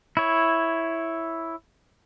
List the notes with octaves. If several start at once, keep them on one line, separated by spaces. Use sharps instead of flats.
E4 C#5